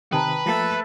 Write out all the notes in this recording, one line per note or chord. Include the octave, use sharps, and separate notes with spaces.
C3 D#3 B4 G5 A5 A#5 D#6
F3 A3 A#3 A4